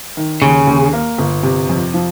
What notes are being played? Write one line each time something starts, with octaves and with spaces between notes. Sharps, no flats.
D#3
D#2 C#3
D#2
A#3
G1
C3
F2
F3